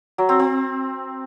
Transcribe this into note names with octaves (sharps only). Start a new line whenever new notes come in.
F#3
C4
C4